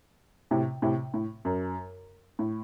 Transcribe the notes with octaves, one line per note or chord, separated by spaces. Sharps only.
A2 C3
A2 C3
A2
F#2
A2